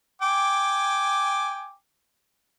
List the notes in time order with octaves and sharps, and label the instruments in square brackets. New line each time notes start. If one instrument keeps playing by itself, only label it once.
[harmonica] G5 G#5 D6